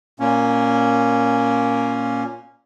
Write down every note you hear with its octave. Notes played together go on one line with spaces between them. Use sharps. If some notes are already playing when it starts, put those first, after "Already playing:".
A#2 A#3 C#4